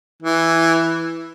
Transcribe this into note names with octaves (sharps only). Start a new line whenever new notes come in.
E3